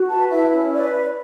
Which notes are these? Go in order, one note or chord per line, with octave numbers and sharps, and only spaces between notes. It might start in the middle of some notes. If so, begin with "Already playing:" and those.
Already playing: F#4
B4 A5
E4 E5
C#4
B4 D5